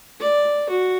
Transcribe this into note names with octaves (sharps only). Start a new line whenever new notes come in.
D5
F#4